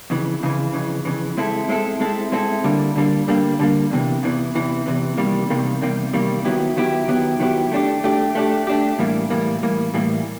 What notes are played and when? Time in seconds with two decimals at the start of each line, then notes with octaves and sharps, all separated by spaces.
0.10 F2 C#3 E3
0.42 F2 C#3 E3
0.73 F2 C#3 E3
1.05 F2 C#3 E3
1.37 G#3 C4 E4 A4
1.69 G#3 C4 E4 A4
2.00 G#3 C4 E4 A4
2.32 G#3 C4 E4 A4
2.64 D3 G3 A#3
2.96 D3 G3 A#3
3.28 D3 G3 A#3
3.59 D3 G3 A#3
3.91 E2 C3 E3
4.23 E2 C3 E3
4.55 E2 C3 E3
4.86 E2 C3 E3
5.17 E2 C3 D#3 G3 A#3
5.50 E2 C3 D#3 G3 A#3
5.81 E2 C3 D#3 G3 A#3
6.13 E2 C3 D#3 G3 A#3
6.45 D#3 F#3 B3 E4 G4
6.76 D#3 F#3 B3 E4 G4
7.08 D#3 F#3 B3 E4 G4
7.40 D#3 F#3 B3 E4 G4
7.72 A3 D4 G4
8.04 A3 D4 G4
8.35 A3 D4 G4
8.67 A3 D4 G4
8.99 A2 E3 G3 A#3
9.30 A2 E3 G3 A#3
9.62 A2 E3 G3 A#3
9.94 A2 E3 G3 A#3